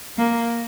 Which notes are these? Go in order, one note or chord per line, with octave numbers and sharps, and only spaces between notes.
A#3